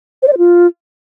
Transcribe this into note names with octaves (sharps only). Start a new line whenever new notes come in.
C5
D5
C5
F4